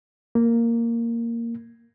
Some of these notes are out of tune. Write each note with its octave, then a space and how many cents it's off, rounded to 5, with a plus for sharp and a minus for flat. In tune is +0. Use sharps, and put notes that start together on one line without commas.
A#3 -5